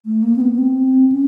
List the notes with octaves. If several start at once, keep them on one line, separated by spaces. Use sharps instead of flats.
A3
A#3
C4
B3
B3
C4
C#4